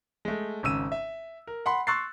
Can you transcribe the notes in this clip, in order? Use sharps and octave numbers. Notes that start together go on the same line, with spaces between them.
G#3 A3
G#1 C#3 E6 D#7
E5
A#4
F#5 B5 C6
C6 C#6 E6 F#6 A6 C7